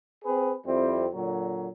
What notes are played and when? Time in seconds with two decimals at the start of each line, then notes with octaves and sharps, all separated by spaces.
0.25 C4 G#4 B4
0.66 F2 G3 C4 E4
1.13 A#2 D3 F#3